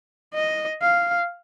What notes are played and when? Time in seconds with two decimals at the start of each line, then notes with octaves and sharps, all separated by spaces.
0.35 D#5
0.82 F5